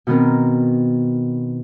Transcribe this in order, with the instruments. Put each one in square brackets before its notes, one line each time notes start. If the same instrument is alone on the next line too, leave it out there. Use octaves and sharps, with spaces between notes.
[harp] B2 D#3 B3 C4 A#4